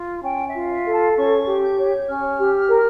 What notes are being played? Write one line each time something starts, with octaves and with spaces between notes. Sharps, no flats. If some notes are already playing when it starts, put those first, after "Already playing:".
Already playing: F4
C#4 G5
E5
F4
E5
A4
A5
C#4 C#6
G4
G6
C#5
C#4 F6
G4
A#4